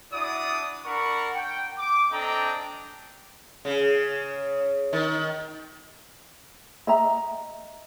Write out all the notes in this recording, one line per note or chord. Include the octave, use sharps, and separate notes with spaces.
D4 E4 F#4 D5 D#6
D4 A#4 F#5 B5 C#6
G5
D6
C4 D4 A4 D#5 G5 A#5
C#3
D#3
D#5 E5 A#5